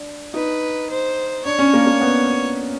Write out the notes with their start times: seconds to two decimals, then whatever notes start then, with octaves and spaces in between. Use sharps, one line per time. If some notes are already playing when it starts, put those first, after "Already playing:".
Already playing: D4
0.34 D#4 B4
0.90 C5
1.45 D4 C#5
1.59 C#4
1.73 A#3
1.87 A#3
2.01 B3